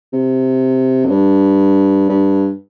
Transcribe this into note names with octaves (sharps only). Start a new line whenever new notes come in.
C3
F2
G2
G2